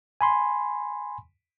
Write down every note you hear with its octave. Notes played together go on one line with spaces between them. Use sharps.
G#5 B5 C6